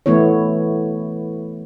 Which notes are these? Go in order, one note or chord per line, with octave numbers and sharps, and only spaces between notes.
E3 A3 B3 E4 C#5